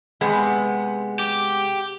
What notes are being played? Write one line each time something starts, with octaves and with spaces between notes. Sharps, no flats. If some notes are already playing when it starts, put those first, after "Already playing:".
C3 G#3 B3
G4